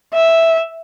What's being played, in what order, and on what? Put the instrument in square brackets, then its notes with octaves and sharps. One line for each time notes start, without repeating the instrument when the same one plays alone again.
[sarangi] E5